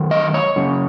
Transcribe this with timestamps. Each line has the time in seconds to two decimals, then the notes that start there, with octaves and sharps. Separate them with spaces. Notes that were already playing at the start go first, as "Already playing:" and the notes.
Already playing: F#2 D#3
0.11 D#5
0.34 C#5
0.56 F#2 C#3